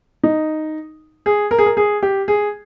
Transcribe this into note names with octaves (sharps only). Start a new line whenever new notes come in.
D#4
G#4
A#4
G#4
A#4
G#4
G4
G#4